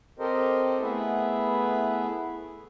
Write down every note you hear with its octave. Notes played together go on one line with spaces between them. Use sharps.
C4 G4 A4 A#4 C5 D#5
A3 B3 E4 G#4 B4 E5